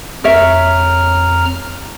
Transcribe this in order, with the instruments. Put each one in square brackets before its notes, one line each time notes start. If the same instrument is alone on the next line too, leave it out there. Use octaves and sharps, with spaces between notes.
[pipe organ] F2 A#5 F6 [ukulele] A#4 C#5 E5